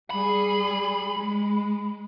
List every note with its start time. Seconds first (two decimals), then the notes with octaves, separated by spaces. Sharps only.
0.10 G3 G#4 B5
1.17 G#3